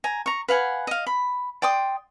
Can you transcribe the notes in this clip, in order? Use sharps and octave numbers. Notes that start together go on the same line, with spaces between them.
G#5 A#5
A#5 C#6
B4 F5 F#5 G#5
D#5 F5
B5
D5 G5 C6 D#6